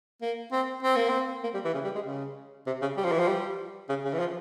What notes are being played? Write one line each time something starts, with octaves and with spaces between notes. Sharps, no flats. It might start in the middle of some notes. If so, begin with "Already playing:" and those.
A#3
C4
C4
A#3
C4
A#3
G3
E3
C#3
G3
G#3
C#3
C3
C#3
G3
F3
E3
F3
G3
C#3
C#3
E3
F3